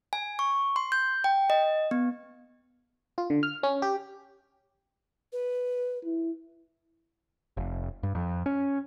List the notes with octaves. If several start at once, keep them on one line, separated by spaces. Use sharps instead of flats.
G#5
C#6
C6
G6
G5
D#5
B3
F4
D3
F6
C#4
G4
B4
E4
F1
G2
F2
C#4